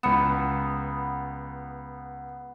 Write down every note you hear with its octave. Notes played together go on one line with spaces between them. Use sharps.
C#2 B3 C#7 E7